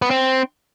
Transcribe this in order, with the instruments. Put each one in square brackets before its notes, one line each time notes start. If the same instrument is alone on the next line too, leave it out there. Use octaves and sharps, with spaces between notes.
[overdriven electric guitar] B3
C4